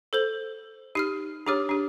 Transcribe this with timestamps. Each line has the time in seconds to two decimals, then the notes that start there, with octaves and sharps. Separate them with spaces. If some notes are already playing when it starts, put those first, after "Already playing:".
0.13 A4 C5 F#7
0.95 D#4 G4 F6 C7 D#7
1.47 D4 G4 G#4 C#5 D6 F6
1.69 D4 G4